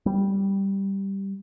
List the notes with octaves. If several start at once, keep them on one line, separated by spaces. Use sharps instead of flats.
G3